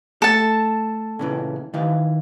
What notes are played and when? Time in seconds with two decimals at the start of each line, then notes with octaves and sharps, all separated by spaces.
0.22 A3 A4 A5
1.19 A#2 C#3 E3
1.74 D#3 E3 F5